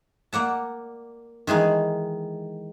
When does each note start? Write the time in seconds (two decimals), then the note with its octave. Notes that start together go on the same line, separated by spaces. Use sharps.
0.33 A#3 D5 F#5 A5
1.47 D#3 E3 G#3 D#4